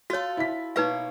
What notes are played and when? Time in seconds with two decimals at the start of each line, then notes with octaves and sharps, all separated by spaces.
0.10 F4 F#4 A4 C#5
0.37 E4 B6
0.76 B2 A#3 D#4 B4 C#5 F5